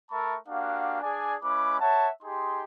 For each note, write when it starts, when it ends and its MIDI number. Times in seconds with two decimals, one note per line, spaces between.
0.11 0.36 57
0.11 0.36 70
0.11 0.36 76
0.11 0.36 81
0.11 0.36 83
0.11 0.36 85
0.48 0.98 58
0.48 0.98 62
0.48 0.98 66
0.48 0.98 67
0.48 0.98 77
0.48 0.98 78
1.01 1.36 62
1.01 1.36 68
1.01 1.36 74
1.01 1.36 80
1.43 1.78 56
1.43 1.78 61
1.43 1.78 64
1.43 1.78 71
1.43 1.78 86
1.80 2.09 73
1.80 2.09 76
1.80 2.09 78
1.80 2.09 81
2.23 2.63 63
2.23 2.63 67
2.23 2.63 68
2.23 2.63 84